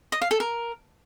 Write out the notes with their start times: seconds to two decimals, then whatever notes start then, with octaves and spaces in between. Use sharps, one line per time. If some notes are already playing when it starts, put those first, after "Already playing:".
0.12 D#5
0.22 F5
0.31 A4
0.40 A#4